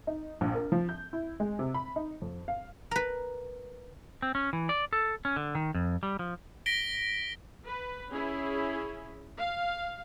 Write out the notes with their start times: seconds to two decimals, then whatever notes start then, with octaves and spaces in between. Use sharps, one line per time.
0.07 D#4
0.41 A#1
0.55 A#4
0.72 F3
0.89 G6
1.13 E4
1.40 G#3
1.59 C3
1.74 B5
1.96 D#4
2.22 F2
2.48 F5
2.91 A#4 B4
4.22 C4
4.35 C#4
4.53 E3
4.69 D5
4.93 A4
5.25 C#4
5.36 D3
5.55 D#3
5.75 F2
6.03 G3
6.19 F3
6.66 A#6 B6 D7 G7
7.66 B4
8.11 C#4 E4 G#4
9.36 F5